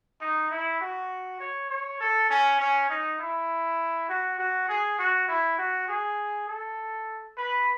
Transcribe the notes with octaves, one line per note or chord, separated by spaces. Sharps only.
D#4
E4
F#4
C#5
C#5
A4
C#4
C#4
D#4
E4
F#4
F#4
G#4
F#4
E4
F#4
G#4
A4
B4